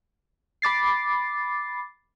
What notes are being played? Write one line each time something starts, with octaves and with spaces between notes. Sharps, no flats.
B5 D6 A6 C7